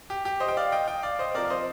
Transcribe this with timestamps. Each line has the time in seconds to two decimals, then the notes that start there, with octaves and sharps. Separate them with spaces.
0.10 G4
0.25 G4
0.40 C5 D#5
0.48 G5
0.57 D5 F5
0.72 D#5 G5
0.88 D#5 G5
1.03 D5 F5
1.19 C5 D#5
1.35 C3 F3 A#4 D5
1.45 F5
1.50 C5 D#5